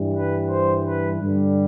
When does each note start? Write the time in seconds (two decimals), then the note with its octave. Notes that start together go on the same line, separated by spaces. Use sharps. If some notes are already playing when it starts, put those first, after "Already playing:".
Already playing: G2 E3 G3
0.15 B4
0.50 C5
0.86 B4
1.21 G2 D3 G3